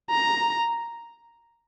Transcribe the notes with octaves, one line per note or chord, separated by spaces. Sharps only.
A#5